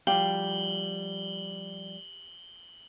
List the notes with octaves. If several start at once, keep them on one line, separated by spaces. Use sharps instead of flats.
F3 G3 G4 F5 F#7 G7